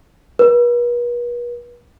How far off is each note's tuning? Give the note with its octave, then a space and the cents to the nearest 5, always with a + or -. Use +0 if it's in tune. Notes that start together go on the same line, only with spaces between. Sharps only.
B4 -45